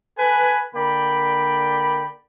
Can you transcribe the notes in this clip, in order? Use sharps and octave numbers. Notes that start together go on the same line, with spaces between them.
A4 B4 G#5
D3 A#3 D5 G5 B5